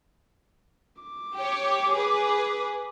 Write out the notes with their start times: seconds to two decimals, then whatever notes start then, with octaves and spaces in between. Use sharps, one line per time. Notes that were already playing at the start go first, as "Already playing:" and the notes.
1.03 D6
1.34 G4 C#5
1.93 G#4 B4